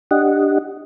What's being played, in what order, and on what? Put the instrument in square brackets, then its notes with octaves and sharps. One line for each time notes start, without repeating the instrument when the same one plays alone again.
[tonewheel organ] D4 G4 D#5 F#5